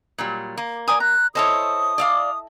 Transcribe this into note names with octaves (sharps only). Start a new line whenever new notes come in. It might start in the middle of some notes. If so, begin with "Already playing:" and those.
A#2 F#3 G3
A#3
D5 G#5 A#5 D#6
A#5 F#6
E4 A4 C5 C#5 D#5 D#6
D5 E5 F5